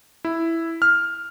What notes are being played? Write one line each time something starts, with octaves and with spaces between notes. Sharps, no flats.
E4
F6